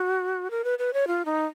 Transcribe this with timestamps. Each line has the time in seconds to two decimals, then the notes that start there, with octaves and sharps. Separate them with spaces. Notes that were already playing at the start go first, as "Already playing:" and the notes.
Already playing: F#4
0.51 A#4
0.64 B4
0.79 B4
0.94 C#5
1.07 F4
1.25 D#4